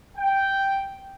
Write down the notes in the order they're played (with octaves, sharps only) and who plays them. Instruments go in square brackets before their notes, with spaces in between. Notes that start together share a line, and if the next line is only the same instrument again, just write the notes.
[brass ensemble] G5